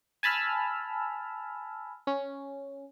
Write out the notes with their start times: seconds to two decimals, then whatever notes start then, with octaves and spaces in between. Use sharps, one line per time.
0.23 G#5 A5 B5 E6 F6
2.07 C#4